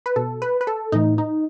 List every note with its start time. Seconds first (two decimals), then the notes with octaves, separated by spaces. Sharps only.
0.06 B4
0.16 B2 A4
0.42 B4
0.61 B4
0.67 A4
0.92 A2 E3 D#4
1.18 D#4